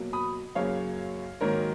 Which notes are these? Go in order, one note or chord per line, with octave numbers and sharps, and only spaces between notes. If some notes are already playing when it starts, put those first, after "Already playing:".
Already playing: B2 F#3 A#3
B5 D#6
F#2 C#3 F#3 A#3 C#5 F5
G#2 D#3 F#3 A#3 A#4 C#5